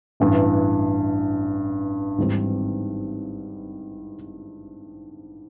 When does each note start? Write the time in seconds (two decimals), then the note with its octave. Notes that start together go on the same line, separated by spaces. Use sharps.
0.20 A1 G2 E3
2.18 G#1 G#2 E3 G3 C4